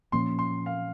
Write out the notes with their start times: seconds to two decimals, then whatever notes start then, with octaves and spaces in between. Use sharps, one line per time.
0.12 A#2 F3 A#3 C#4 C6
0.39 C6
0.66 F5